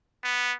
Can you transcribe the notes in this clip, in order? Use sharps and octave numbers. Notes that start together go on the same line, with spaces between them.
B3